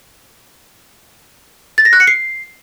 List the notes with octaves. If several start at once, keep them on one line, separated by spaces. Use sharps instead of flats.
A6
A#6
F#6
C#7
C7